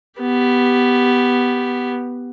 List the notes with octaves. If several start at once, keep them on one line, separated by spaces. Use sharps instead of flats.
B3 G4